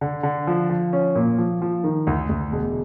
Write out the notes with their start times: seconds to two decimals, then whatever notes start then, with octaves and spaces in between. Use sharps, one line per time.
0.01 D3
0.23 D3
0.47 F3
0.70 F3
0.93 C#4
1.15 A#2
1.38 F3
1.62 F3
1.84 D#3
2.07 D2
2.29 D2
2.52 E1